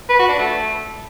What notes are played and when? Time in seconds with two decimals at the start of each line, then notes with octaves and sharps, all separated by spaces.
0.10 B4
0.19 F#4
0.29 D4
0.39 A3